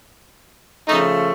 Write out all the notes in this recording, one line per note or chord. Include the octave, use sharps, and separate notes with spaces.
C#3 F3 A3 D#4